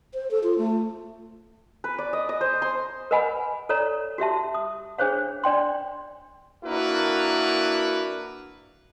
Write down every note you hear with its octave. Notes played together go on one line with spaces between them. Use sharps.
C5
A4
F4
A3
B4
D5
D#5
D#5
C5
C6
A#4 B4 D#5 F#5 G#5 B5
A4 C#5 D5 A#5
F#4 G4 E5 A5
D#6
D4 G#4 C5 C#5 F5
D4 D5 G5 C6
A#3 D4 E4 F#4 A#4 B4